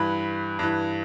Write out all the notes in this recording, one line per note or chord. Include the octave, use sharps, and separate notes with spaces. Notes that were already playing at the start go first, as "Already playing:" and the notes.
Already playing: G2 E3 B5
G2 E3